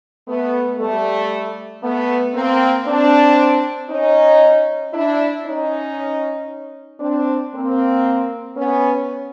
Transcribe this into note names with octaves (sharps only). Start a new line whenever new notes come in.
A3 B3
G3 A3
A3 B3
A#3 C4
C4 D4
C#4 D#4
D4 E4
C#4 D#4
C4 D4
A#3 C4
B3 C#4